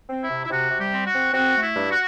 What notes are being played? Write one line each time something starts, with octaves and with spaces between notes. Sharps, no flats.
C4
E4
C3
E4
C3 F#4
C3
G3 G4
C4
F#4
C4
C4 F#4
A3
E4
G2
F#4